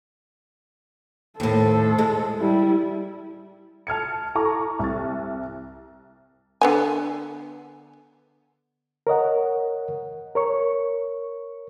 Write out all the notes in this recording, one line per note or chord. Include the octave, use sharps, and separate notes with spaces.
D#2 A2 A4 C5
G#3
G3 E4
A5 F6 G#6 C#7
E4 A4 A#5 C#6 D6
C2 A6
D3 B3 G#5
A#4 C#5 D#5 F#5
A#4 C#5 C#6